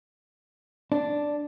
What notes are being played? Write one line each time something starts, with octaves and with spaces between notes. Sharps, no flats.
D4